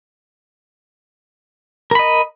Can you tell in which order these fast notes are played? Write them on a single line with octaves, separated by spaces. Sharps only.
A#4 B5 D#5